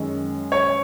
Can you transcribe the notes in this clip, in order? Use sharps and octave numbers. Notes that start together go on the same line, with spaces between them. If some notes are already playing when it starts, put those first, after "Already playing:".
Already playing: F#2 D#3 G#3 C#4
C#5